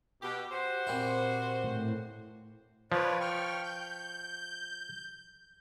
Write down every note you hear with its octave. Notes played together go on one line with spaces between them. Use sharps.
B2 G4
F#4 G4 C5
A#2 C4 E4
A2
F3 B4 C#5 D5
G5 C#6 F6
G6